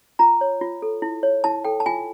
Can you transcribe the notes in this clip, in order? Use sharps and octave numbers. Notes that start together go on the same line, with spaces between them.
F4 A#5
C#5
F4
A4
E4
C#5
E4 A5
A4 G5
A5
F4 G#5